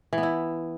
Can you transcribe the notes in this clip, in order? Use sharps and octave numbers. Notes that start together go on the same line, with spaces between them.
E3
B3
E4